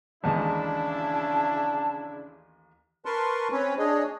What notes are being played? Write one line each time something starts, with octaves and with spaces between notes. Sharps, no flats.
A1 D#2 C#3 G#3 D4 E4 A5
A#4 B4 A5 C6 C#6
C4 C#4 B4 C#5
D4 G#4 C#5 D#5